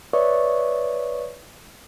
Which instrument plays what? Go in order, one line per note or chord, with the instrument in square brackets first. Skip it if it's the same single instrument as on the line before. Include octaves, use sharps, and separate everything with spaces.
[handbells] B4 C#5 D5 E5 C#6 D#6